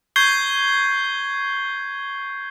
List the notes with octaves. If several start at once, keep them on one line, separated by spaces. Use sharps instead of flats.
C#6 G6 G#6 C7 G7